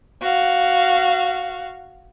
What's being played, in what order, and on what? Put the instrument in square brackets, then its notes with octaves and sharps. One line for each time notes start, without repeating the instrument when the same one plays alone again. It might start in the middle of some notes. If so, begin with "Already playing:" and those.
[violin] F#4 F5